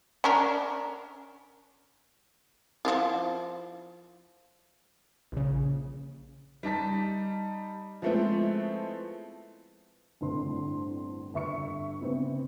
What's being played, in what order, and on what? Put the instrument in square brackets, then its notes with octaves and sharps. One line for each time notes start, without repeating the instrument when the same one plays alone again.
[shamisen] C#4 D4 A#4
F3 E4 F4
[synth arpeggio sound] A#1 C#3
[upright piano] G3 D#4 A5 B6
F3 G#3 A3 B3 C4 E4
[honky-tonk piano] G1 A2 D3 C4 C6
G1 E5 C#6 C#7
C#3 B3 C4